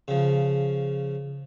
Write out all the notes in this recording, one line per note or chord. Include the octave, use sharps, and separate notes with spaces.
C#3 F3